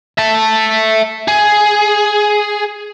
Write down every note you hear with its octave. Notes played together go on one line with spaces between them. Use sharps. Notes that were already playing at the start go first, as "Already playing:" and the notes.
E5 A5
G#4